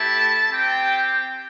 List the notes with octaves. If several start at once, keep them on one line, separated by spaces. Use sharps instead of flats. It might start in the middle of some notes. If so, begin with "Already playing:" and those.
Already playing: A3 E4 G4 A5
C4 G4 G5